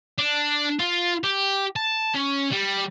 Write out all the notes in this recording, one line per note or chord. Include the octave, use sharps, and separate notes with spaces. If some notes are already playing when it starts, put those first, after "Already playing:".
D4
F4
G4
A5
C#4
G3